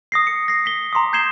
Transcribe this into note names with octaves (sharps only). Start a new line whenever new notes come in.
D#6 A#6 C7
C#7
A#6 C7
B6 G7
A#5 C6 D6 D#6
A#5 G6 G#6 C7 E7 G7